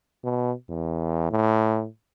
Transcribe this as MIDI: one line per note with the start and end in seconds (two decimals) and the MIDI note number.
0.24 0.52 47
0.69 1.30 40
1.31 1.86 45